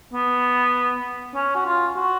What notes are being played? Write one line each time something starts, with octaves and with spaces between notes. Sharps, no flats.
B3
C#4
F#4
F4
F#4